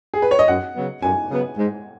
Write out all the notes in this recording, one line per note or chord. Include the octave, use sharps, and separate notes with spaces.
G#4
B4
C#5
D#5
F#2 F#5
C#3 F#3 B3
F#2 G#5
C#3 F#3 B3
G#2